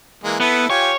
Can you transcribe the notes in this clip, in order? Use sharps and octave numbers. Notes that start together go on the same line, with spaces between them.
E3 G#3 A#3
B3 E4 A4
F4 G4 C#5 G#5